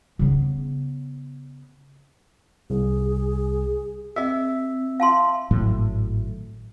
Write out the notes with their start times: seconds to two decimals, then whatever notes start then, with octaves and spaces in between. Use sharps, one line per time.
0.19 C#3 B3
2.70 C2 G#4
4.16 C4 G#4 D#5 E5
5.00 F5 A5 C6
5.51 G#1 A2 F#3 A3